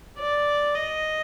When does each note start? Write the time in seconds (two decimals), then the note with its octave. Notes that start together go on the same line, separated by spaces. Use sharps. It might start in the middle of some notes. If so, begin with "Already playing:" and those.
0.18 D5
0.75 D#5